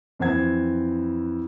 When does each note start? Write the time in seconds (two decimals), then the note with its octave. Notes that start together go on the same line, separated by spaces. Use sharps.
0.19 F2 E3 C5 F#5 G#6